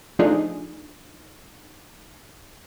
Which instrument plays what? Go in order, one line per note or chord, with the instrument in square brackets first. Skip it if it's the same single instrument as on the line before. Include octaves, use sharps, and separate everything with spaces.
[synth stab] F3 A3 D4 D#4 G#4